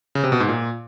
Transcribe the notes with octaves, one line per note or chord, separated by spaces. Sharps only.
C#3
C3
B2
G#2
A#2